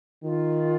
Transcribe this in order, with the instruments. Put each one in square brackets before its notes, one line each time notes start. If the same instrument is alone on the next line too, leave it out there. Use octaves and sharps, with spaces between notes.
[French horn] D#3 [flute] F4